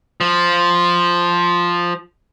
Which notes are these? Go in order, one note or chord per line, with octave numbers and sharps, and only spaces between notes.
F3